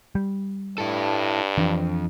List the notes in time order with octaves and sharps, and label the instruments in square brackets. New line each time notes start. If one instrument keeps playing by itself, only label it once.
[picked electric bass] G3
[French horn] G2 [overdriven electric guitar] E4 A4
[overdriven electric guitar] F2 [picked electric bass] E3 D4